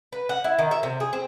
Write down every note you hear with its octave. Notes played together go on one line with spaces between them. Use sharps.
B4
F#5
E4
D#3
E5
C3
G#4
C4